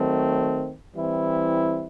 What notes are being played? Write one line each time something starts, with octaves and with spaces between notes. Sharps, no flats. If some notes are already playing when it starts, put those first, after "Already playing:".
Already playing: D#3 F#3 A3 C4
E3 G3 C4 E4